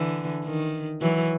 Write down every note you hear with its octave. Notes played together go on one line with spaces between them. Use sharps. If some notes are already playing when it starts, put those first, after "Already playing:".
Already playing: D3 E3
D#3
E3 F#3